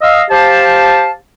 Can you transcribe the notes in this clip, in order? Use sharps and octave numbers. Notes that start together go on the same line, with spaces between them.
D#5 F5 E6
G4 C5 F5 A5